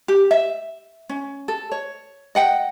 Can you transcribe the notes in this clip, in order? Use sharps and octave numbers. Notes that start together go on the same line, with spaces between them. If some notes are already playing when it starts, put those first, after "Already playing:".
G4
E5
C#4
A4
C#5
D#5 F#5 G5